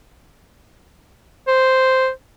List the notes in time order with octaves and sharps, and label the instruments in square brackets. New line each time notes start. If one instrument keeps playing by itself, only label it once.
[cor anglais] C5